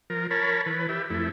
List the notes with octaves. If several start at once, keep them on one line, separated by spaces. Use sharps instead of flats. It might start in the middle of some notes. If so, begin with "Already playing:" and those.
F3 A#4
A#4 C#5 A5 B5
E3 B4
G4 E5
F2 A3 E4